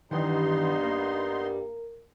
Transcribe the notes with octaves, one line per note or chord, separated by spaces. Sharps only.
G2 D#3 E3 G3 B3 D#4 G4 C6
A#3 A#4